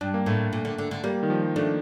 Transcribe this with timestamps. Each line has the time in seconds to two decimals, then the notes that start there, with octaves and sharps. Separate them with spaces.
0.01 G2 D4
0.14 A#3
0.26 A2 A3
0.53 A#2
0.65 D3
0.78 D3
0.91 D3
1.04 G3 A#3
1.23 D#3
1.30 F3
1.56 A3 D4